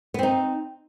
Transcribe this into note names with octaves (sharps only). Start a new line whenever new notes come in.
B3 C4 D#4